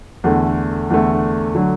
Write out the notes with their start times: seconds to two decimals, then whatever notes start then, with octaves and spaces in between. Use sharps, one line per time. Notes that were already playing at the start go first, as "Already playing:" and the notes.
0.24 E2 D3 A3
0.90 E2 D3 A3
1.55 D3 F#3